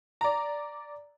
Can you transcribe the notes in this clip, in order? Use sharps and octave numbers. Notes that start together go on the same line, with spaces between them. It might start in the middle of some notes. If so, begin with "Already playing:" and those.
D5 A#5